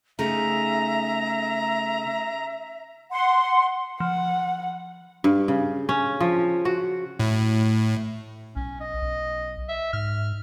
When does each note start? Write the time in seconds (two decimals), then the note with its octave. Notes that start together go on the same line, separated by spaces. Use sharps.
0.19 C#3 A3 D#4 E5 A#5
3.12 F#5 C6
4.00 F3 F#5
5.24 G2
5.48 C#3
5.89 C#4
6.20 F3
6.65 F#4
7.19 A2
8.56 B1 C#4
8.81 D#5
9.02 B1
9.69 E5
9.93 G#2 F6